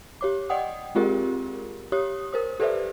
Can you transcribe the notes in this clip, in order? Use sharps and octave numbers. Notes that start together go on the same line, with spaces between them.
G4 C#5 D6
D5 D#5 F#5 G5 D#6
G#3 C4 F4 G4 G#4 A#4
G4 C#5 D#6
A#4 C5 D#6
G4 A4 B4 C5 D5 E5